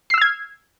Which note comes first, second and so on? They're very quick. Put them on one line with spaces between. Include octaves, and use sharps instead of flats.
C7 E6 F6 G#6